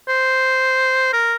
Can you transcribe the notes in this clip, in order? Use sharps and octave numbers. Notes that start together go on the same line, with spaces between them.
C5
A#4